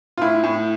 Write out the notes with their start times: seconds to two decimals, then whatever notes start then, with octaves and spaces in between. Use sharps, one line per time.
0.18 F4
0.22 A2 E4
0.44 A2